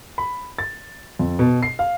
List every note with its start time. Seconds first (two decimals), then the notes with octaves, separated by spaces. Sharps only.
0.18 B5
0.58 A6
1.19 F2
1.39 B2
1.63 C7
1.79 F5